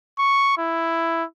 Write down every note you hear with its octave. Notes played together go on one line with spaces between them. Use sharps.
C#6
E4